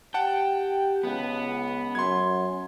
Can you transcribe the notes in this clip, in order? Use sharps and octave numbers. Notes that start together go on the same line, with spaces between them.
G4 F#5 G5 A5
C#2 B3
F#2 C6 G#6